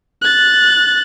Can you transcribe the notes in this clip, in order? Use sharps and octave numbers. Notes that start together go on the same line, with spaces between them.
F#6 A6